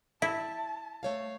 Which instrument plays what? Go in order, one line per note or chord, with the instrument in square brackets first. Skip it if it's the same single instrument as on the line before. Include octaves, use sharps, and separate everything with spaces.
[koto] E4 [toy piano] E5 [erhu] A5
[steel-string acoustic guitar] A3 C#5 F5